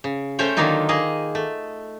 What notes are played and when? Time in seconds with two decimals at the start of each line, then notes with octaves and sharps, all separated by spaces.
0.04 C#3
0.39 A3 C#4 C5 C#5 G5
0.57 D3 D#3 F#3 A#3 D#4 F4
0.89 A#3 G#4 D#5
1.35 A3